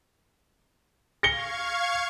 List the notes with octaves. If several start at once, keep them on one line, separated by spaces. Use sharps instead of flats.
F5 C#6 G#6 A#6 C#7 G7